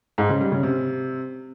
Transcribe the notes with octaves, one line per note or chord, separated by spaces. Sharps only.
G#2
C#3
G3
C#3
C3